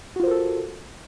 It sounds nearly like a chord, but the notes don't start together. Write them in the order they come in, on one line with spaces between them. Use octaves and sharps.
F#4 F4 C5 A#4 A4